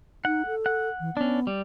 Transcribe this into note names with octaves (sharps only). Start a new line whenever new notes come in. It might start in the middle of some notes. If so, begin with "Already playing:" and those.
D#4 F#5
A4
F#5
E3
B3 C#4 D4
G3